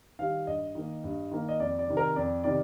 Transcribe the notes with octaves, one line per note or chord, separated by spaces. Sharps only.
D#3 G3 F5
G2 D#5
D#3 A#3
G2
D#3 A#3
D#5
F2 D5
D5
C3 D#3
A#4
F2 D5
C3 D#3 D5